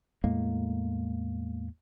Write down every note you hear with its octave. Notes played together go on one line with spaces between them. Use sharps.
E2 A2 G#3 A#3